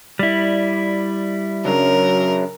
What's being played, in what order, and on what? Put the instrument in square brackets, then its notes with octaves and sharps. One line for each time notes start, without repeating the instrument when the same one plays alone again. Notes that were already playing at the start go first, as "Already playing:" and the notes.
[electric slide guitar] G3 E4 [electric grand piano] D5
[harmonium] F#2 [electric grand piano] C#3 F#3 D4 [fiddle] A#4